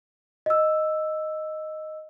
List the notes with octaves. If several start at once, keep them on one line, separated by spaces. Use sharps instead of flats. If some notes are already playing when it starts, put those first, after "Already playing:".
D#5 E6